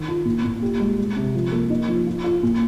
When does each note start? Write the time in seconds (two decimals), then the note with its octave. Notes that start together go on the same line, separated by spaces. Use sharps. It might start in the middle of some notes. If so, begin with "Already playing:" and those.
Already playing: D#3
0.08 F4
0.25 A#2
0.44 A#2
0.62 G4
0.80 G#3
0.98 G#3
1.16 C3
1.35 F3
1.52 A#3
1.70 D#4
1.88 F3
2.07 F4
2.24 F4
2.43 A#2